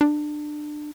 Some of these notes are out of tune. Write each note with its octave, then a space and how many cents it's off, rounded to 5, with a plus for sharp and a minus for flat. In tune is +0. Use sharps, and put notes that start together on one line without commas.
D4 +25